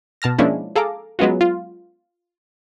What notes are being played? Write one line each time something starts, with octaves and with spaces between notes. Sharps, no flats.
B2 A5 F6 A#6
F3 G#3 A#3 C#4 D4 E4
G#4 A4 F5 A#5 D6
F#3 G#3 B3 C#4 F4 F#4
F4